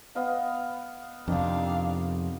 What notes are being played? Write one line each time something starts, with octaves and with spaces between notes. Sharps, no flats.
B3 D#5 F5
F2 C3 D#3 D4 F5